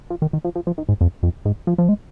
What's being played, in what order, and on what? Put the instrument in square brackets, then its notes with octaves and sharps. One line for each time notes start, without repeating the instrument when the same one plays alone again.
[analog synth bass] F3
D#3
D#3
F3
F3
F3
D#3
G#2
F2
F2
G#2
F3
F3
G#3